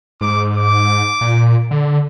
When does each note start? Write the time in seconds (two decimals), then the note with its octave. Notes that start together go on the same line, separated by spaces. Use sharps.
0.21 G#2 D6
0.54 D6
1.21 A#2
1.71 D3